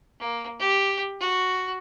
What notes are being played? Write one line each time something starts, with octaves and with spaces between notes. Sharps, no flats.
A#3
G4
F#4